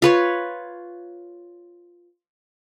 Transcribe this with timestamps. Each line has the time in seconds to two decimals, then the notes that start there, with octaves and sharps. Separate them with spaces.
0.02 F4 B4 C#5